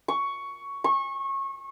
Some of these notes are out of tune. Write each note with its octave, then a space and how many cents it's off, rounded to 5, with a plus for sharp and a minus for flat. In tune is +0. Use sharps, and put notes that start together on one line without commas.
C#6 +10
C#6 -25